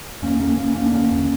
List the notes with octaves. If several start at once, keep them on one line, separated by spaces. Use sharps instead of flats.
E2 A#3 C#4
D3 A#3 C#4
E2 A#3 C#4
E2 A#3 C#4
D4
D3 A#3 C#4
E2